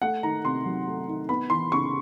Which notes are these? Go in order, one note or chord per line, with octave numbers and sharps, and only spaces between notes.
A3 F#5
D#3 A#5
C3 C6
F#3
A3
D#3
B3 B5
E3 C6
C#3 C#6